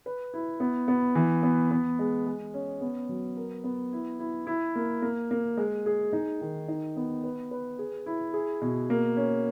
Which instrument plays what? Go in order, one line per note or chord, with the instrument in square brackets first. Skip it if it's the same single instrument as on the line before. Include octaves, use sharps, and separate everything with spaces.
[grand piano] B4
E4
B3
B3
E3
B3
B3
G#3
G#3
C#4
B3
F#3
A#4
B3
E4
E4
E4
A#3
A#3
A#3
G#3
G#4
D#4
D#3
D#4
B3
B4
B4
G#4
E4
G#4
B2
A#3
C#4